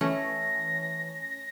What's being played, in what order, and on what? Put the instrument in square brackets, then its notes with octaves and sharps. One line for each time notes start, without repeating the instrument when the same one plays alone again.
[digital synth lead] E3 [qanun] A3 [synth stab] C#4 [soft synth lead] A#6